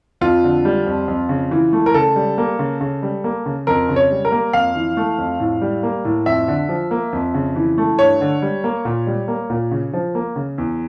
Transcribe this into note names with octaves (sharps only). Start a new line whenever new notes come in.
F2 F4
D3
G3
F2
F2
C#3
E3
A3
A#4
C#3 A4
G3
A#3
C#3
C#3
G3
A#3
C#3
F2 A#4
C#3
C#5
G3
A#4
A#3
F2 F5
E3
A3
F2
A2
G3
A#3
A2
F2 E5
D3
F3
A#3
F2
C#3
E3
A3
G2 C#5
D3
G3
A#3
A#2
G3
A#3
A#2
C#3
F3
A#3
C#3
E2